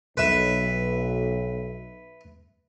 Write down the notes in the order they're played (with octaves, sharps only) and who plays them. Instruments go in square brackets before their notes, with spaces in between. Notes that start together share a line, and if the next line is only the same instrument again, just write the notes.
[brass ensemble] B1 [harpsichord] B4 E5